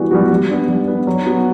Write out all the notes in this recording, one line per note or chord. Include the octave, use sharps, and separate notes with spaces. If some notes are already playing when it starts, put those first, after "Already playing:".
Already playing: E3 G3 B3 F#4
G3 B3 F#4
G3
B3 D4
G3
B3 D4
F#3
B3 F#4